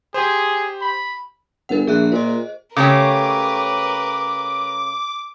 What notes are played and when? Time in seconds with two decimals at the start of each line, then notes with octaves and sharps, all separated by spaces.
0.14 G4 G#4 C5
0.81 B5
1.69 G1 A#4 F#5
1.87 A#1 G#4 E5 F#6
2.12 A#2 C5 D#5
2.76 C#3 A3 G4 A#4 B4 C#5 A#5 D6